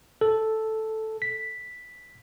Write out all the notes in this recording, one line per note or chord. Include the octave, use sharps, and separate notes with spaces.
A4
B6